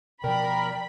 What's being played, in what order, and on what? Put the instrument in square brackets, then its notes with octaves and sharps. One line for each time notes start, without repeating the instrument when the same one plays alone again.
[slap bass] B2 F3 [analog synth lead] A#4 [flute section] D5 G5 [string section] B5